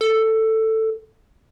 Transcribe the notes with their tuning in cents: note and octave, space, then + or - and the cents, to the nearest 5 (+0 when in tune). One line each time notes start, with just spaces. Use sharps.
A4 +10